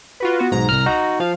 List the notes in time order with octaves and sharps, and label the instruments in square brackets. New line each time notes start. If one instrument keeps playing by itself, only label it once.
[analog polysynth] F4 F#4 B4
B3 F#4
[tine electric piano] B1 G#2 [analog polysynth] A#5
[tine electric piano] C2 F6
D#4 F#4
[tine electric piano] F3 [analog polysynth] F5